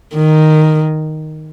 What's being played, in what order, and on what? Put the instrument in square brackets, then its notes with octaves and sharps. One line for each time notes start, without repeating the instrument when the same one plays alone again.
[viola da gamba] D#3